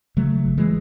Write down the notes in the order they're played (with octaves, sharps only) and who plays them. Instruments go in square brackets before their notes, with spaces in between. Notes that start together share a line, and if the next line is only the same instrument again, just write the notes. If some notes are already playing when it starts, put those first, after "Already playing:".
[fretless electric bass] C#3 F#3 A3
G#1
E3 G#3